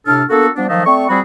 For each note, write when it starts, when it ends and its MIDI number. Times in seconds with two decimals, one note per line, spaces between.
0.06 0.22 45
0.06 0.22 48
0.06 0.22 62
0.06 0.22 69
0.06 0.22 89
0.30 0.47 58
0.30 0.47 59
0.30 0.47 62
0.30 0.47 66
0.30 0.47 69
0.56 0.68 53
0.56 0.68 55
0.56 0.68 59
0.56 0.68 62
0.69 0.82 51
0.69 0.82 53
0.69 0.82 54
0.69 0.82 57
0.69 0.82 75
0.69 0.82 77
0.85 1.08 57
0.85 1.08 60
0.85 1.08 74
0.85 1.08 85
1.08 1.19 53
1.08 1.19 55
1.08 1.19 60
1.08 1.19 66
1.08 1.19 68
1.08 1.19 83